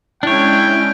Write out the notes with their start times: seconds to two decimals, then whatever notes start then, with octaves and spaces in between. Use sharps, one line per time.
0.23 G#3 C#4 D4 E4 C#5 G5 F6